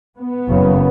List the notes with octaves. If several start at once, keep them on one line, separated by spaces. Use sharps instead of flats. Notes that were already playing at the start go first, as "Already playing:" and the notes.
B3
F#1 F#2 C#3